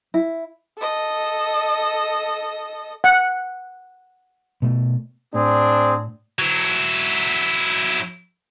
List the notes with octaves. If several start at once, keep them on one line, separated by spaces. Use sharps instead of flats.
E4
A4 D#5
F#5
B2 A3
A2 C4 D4 G#4
F#3 E4